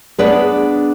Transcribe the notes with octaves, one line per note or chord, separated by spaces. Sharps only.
B3 D4 G#4 B4 D5